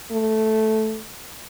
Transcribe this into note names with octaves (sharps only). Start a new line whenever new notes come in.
A3